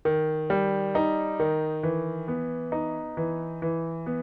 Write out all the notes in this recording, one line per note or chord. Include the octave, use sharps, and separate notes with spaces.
D#3
G3
D#4
D#3
E3
B3
D#4
E3
E3
B3